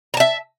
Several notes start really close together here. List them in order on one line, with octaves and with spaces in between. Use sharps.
A#5 A5 E5